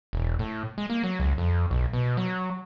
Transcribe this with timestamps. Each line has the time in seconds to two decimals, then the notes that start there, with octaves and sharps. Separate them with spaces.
0.13 E1
0.39 A2
0.78 G#3
0.90 A#3
1.04 F#3
1.20 C#2
1.38 F2
1.71 B1
1.93 B2
2.17 F#3